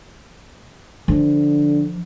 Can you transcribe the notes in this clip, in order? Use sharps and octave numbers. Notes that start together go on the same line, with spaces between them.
D3 F3